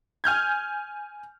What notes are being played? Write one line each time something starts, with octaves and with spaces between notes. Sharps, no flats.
G#5 F6 G6 G#6